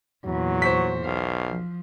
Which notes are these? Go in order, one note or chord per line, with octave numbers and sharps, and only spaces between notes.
E2 A#2 F#3
C5 C#6 B6
B1 F5
F3